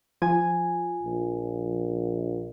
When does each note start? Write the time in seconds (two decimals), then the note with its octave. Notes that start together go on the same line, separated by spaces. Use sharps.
0.22 F3 G#5
1.03 A#1